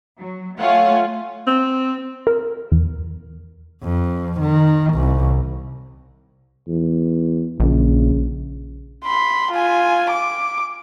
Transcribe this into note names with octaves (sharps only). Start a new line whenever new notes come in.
F#3
A3 F4 C#5 F5 F#5 G#5
C4
A#4
E2
F2
D#3
C2
E2
A#1 C#3
B5 C6
F4 G#5
D6